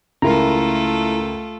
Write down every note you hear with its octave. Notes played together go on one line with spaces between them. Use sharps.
C#2 A3 E4 F4 A4 A#4 A#5